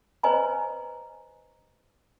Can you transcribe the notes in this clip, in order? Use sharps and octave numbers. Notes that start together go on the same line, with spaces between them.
B4 C5 D#5 G#5 A#5